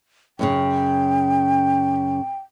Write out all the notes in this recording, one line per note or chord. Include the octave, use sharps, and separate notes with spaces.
F#2 A2 C#3 G5